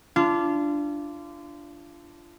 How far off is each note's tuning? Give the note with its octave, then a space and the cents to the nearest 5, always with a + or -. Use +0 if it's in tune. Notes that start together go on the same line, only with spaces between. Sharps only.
D4 -5 F4 -30